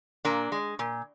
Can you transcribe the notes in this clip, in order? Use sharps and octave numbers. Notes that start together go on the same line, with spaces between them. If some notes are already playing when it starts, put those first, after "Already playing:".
A#2 A#3 D4
G#3
A#2